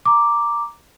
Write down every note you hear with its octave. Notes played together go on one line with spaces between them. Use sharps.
A#5 D6